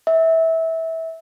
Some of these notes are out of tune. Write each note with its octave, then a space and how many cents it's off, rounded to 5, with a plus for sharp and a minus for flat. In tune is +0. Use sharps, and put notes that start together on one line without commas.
E5 -20